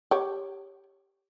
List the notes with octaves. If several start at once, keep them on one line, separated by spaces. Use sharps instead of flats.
G4 C#5